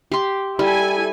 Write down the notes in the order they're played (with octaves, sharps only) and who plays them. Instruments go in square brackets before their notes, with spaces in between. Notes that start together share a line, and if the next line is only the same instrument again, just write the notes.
[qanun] G4 C6
[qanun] G3 [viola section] E4 A4 G#5